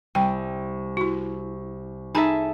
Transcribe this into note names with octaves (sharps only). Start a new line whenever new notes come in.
C2 G5
E4 F#4
D#4 G#4 A4 E5 G#5 A#5